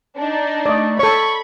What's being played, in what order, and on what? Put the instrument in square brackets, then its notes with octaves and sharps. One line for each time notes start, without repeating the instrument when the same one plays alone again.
[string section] D4 D#4
[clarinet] A3 [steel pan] D5 D#5
[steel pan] A4 C#5 [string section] B5 [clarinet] C#6